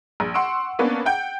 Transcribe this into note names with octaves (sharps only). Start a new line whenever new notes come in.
A#1
F#5 C6 C#6 E6 D7
A#3 B3 C#4 D4
F#5 G5 G6